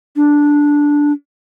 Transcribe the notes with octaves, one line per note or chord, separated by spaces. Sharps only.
D4